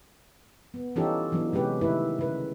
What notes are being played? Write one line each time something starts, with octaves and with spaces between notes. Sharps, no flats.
B3
E3 C#4 D#4 F4 G4 A4
E3 F#3 B3 D4
C3 G#3 C#4 G4 B4
D#3 A3 E4 B4
C#3 B4